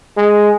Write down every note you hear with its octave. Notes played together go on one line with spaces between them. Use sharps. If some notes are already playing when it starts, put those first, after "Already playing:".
G#3